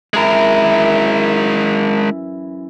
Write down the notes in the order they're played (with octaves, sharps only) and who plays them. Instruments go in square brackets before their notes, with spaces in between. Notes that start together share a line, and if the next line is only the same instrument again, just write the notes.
[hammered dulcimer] F#2 E3 E4 [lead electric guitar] G#3 A#4